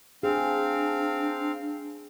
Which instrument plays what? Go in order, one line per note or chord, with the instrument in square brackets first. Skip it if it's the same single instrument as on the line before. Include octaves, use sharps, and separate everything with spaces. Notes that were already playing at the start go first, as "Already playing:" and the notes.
[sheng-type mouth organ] C4 F5 [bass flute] D4 [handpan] G#4